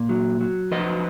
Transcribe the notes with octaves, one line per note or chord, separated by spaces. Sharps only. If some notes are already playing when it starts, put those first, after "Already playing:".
Already playing: A#2
F#3
F#3
F3 B4 D#5